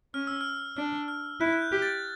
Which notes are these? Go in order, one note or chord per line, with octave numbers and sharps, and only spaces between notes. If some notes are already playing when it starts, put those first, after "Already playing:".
C#4 F6
E6
F6
D4 F6
F6
E4 F#6
F#6
G6
G4
A6